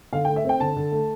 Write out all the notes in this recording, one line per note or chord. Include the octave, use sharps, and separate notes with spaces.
D3 F5
G5
A3
E5
C4 G5
D3 A5
D3
A3